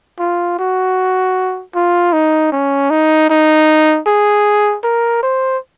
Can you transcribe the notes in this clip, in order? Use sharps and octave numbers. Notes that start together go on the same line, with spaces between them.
F4
F#4
F4
D#4
C#4
D#4
D#4
G#4
A#4
C5